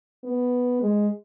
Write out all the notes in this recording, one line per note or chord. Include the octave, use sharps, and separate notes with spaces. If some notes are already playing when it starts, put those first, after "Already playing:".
B3
G#3